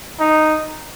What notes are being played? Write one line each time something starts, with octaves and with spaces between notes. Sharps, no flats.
D#4